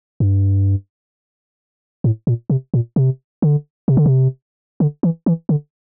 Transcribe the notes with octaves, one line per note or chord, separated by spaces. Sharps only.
G2
A2
A#2
C3
A#2
C3
D3
C3
D3
C3
D3
E3
E3
D3